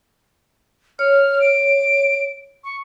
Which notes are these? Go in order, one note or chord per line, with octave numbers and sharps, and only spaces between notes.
C#5 F6
D7
C#6